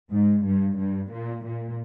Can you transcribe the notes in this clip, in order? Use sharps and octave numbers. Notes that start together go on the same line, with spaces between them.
G#2
G2
G2
A#2
A#2